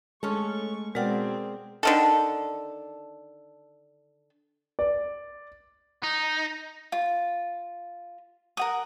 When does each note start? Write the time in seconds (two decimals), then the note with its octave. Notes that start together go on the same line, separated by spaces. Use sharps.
0.23 G#3 A3 C#4 A4 C#6
0.95 B2 G#3 C4 G#4 A#4 D5 F#5 G5
1.83 D3 D#3 A4
4.79 D5
6.03 D#4
6.92 F4
8.57 A#4 F#5 D#6